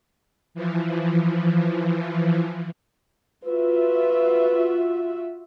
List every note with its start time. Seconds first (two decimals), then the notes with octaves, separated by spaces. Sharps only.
0.54 E3 F3
3.45 F4 F#4 B4 E5